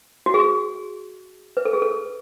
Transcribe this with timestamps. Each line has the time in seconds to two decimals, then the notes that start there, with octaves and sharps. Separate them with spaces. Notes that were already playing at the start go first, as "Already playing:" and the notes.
0.26 F#4
0.34 G#4
1.57 B4
1.65 A4
1.73 G#4
1.82 A4